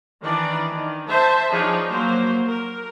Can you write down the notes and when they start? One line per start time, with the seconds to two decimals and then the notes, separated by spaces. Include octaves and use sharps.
0.22 D#3 E3 D4 D5
0.73 D#3
1.08 C5 E5 A5
1.52 F3 D4 D#4 G#4 C#5
1.90 F#3 A#3 C5
2.46 A#4